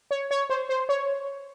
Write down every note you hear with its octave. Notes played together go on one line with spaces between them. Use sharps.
C#5
C#5
C5
C5
C#5